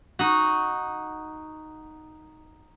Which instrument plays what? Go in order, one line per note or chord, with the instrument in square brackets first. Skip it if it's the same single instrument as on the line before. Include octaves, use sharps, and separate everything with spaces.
[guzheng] D#4 F#4